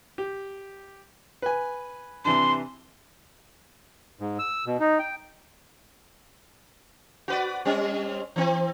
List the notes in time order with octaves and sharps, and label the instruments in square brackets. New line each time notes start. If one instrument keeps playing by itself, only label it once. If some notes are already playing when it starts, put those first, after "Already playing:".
[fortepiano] G4
B4 G#5
[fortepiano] C3 E3 D4 [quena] C6
[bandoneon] G#2
E6
B2
D#4
G5
[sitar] F#4 B4 D5
G3 C4 C#4
E3 C4